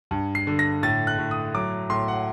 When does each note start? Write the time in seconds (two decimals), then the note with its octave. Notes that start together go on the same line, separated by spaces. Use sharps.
0.11 G2
0.35 C7
0.47 D3
0.59 A#6
0.83 A2 A6
1.07 F#6
1.19 A2
1.31 D#6
1.54 F#3 D6
1.90 A2 C6
2.08 F#5